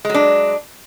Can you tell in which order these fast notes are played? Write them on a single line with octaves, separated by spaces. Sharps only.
G#3 F#3 D4